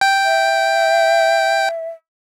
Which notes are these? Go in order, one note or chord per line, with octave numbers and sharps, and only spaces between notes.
G5
E5